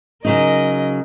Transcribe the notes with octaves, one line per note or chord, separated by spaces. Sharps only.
C#3 F#3 D#4 A#4 D#5